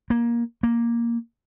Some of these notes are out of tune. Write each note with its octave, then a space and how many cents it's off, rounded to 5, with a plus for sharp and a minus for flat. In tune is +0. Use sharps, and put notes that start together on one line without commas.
A#3 +15
A#3 +5